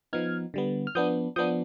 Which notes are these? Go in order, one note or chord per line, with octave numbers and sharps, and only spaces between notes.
F3 B3 D#4 F6 G#6
D3 G3 B3
F6
F3 B3 D4 D#6 G6
F3 B3 D4 D#6 G6